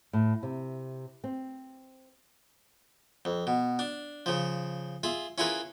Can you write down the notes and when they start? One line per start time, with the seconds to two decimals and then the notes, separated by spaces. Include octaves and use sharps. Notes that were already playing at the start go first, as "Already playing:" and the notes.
0.13 A2
0.43 C3
1.24 C4
3.25 F2
3.47 B2
3.79 D4
4.26 C#3 F3
5.03 F4 G#4 E5
5.38 C#4 E4 F4 G#4 A#4 B4